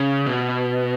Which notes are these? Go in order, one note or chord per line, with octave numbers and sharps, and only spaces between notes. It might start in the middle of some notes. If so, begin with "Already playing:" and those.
Already playing: C#3
B2